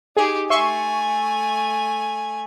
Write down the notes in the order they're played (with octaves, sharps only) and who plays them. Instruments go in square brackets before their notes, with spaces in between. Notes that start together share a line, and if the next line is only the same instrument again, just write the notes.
[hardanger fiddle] D#4 G4 [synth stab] G#4
[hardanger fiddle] A3 G#5 [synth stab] E5 C6 C#6